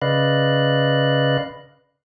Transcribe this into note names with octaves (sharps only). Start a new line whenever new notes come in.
C#3 B4 D5 D#5 F5 F#6